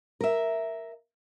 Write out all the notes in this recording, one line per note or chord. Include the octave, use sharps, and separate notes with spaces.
A#4 E5